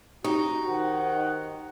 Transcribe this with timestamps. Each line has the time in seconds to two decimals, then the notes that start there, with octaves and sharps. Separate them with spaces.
0.24 D#4 F#4 G4 C#6 D#6
0.68 D#3 C5 F#5